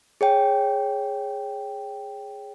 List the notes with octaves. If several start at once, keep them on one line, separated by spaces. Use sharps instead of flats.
G#4 C#5 G5